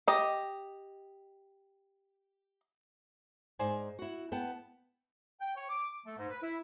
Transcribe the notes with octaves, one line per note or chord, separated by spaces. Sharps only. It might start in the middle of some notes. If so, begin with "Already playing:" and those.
G4 D#5
G#2 D#4 C5 D5 G#5
E4 F#4
B3 G5 A5
G5
C#5
D6
A3
G#2
B4
E4